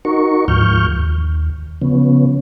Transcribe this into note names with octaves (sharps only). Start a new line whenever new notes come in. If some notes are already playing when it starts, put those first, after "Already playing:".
D#4 F#4 A#4 C#6
D2 G#2 F3 C#6 F6 G6
D#2
C#3 F3 B3 C#4